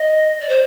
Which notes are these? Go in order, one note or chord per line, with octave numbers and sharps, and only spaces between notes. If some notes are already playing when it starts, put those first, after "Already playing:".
Already playing: D#5
D5
C5